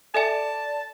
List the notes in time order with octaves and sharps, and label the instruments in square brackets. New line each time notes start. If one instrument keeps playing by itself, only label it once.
[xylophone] A4 E5 G#5 [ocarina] D5 [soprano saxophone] A5